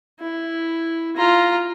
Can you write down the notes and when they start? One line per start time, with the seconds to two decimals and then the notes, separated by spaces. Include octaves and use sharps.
0.20 E4
1.16 F4 A#5